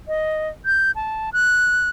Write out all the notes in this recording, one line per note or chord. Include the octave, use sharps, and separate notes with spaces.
D#5
G6
A5
F#6